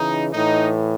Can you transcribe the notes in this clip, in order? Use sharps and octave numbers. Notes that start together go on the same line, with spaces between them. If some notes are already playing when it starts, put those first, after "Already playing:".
Already playing: C#3 E3 D#4
A2 E3 D#4